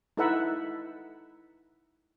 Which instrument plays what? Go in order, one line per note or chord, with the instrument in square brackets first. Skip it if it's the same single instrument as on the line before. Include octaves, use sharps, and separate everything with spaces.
[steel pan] D#4 E4 A4 B4 E5 F#5